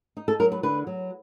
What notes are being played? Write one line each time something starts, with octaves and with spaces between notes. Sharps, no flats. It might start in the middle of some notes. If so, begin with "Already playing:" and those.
D#4
A4
F#3 A#4
B4
D3 B4
F#3